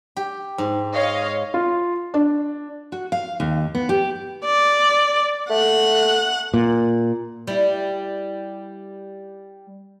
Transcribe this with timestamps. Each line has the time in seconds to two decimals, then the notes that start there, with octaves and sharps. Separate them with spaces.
0.17 G4
0.58 G#2
0.94 C#5 D#5 F5
1.54 F4
2.14 D4
2.92 F#4
3.12 F5
3.40 D#2
3.75 B3
3.89 G4
4.45 D5
5.50 A3 F#5
6.54 A#2
7.47 G3 E4